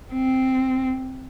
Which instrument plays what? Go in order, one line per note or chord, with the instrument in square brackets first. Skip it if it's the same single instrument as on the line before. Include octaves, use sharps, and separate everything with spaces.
[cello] C4